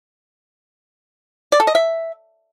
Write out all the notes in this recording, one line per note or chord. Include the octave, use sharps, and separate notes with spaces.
D5
A4
D#5
E5